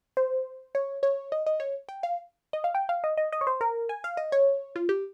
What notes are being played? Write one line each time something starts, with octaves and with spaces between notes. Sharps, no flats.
C5
C#5
C#5
D#5
D#5
C#5
G5
F5
D#5
F5
G5
F5
D#5
D#5
D#5
C#5
C5
A#4
G#5
F5
D#5
C#5
F4
G4